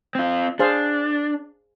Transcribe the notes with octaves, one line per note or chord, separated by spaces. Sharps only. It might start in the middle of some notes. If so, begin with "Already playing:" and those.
C4 F4
D4 G#4 C5 F5